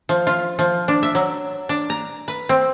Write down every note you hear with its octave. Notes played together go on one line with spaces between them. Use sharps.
F3
F4
F3
D4
E5
F#3
D4
A#5
B4
C4